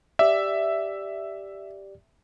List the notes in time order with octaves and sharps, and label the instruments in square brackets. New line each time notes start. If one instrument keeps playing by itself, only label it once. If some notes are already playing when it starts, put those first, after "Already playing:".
[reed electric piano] G4 D5 [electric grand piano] E5